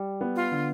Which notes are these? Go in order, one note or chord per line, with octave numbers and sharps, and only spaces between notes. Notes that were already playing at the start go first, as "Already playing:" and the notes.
Already playing: G3
B3
F4
D3